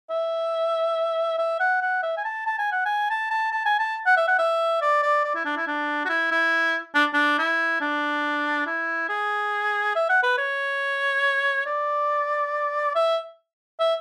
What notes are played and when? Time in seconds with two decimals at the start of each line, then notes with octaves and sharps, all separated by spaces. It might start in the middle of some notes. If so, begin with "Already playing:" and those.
0.10 E5
1.38 E5
1.60 F#5
1.82 F#5
2.03 E5
2.18 G#5
2.25 A5
2.46 A5
2.59 G#5
2.72 F#5
2.86 G#5
3.10 A5
3.31 A5
3.52 A5
3.66 G#5
3.79 A5
4.06 F#5
4.17 E5
4.28 F#5
4.38 E5
4.82 D5
5.03 D5
5.25 D5
5.35 E4
5.45 D4
5.57 E4
5.68 D4
6.05 F#4
6.09 E4
6.32 E4
6.95 D4
7.14 D4
7.39 E4
7.81 D4
8.67 E4
9.09 G#4
9.96 E5
10.10 F#5
10.23 B4
10.38 C#5
11.66 D5
12.95 E5
13.80 E5